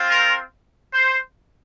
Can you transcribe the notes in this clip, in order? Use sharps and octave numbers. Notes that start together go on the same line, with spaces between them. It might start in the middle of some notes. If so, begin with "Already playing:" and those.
Already playing: C4 F4
A#4
C5